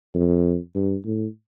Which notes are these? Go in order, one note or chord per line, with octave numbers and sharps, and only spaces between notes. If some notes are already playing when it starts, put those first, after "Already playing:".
F2
G2
A2